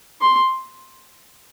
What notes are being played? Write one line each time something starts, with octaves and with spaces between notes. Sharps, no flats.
C6